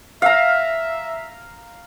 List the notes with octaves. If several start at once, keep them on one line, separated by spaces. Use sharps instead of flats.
E5 F5 A#5